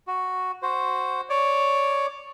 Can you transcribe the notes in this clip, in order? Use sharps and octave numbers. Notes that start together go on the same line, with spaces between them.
F#4
F#4 C5
C#5 D5